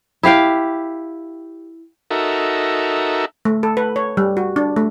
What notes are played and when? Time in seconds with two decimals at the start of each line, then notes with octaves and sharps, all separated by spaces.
0.23 E4 G4 F5 G5
2.11 D#4 F#4 A4 A#4 E5
3.45 A3
3.63 A4
3.77 B4
3.96 C#5
4.17 G3
4.37 F#4
4.56 D4
4.76 A3